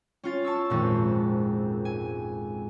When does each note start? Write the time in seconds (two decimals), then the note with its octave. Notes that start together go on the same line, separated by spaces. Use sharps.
0.24 C#4 F4 A6
0.45 A5 C#6 E6
0.70 G#1 F2 A#2
1.85 G#5